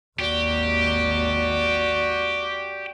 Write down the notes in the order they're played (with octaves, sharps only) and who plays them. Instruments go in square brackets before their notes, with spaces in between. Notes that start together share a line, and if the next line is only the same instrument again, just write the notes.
[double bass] G#1 D#2 [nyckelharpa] F#4 [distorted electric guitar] G4 [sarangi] D5